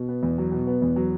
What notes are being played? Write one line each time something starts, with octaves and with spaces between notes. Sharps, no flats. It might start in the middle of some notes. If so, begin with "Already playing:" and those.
Already playing: B2
B3
E2
F#3
B2
B3
E2
F#3